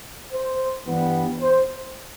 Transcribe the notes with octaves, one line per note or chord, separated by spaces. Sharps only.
C5
G2 E3 G3 B3
C5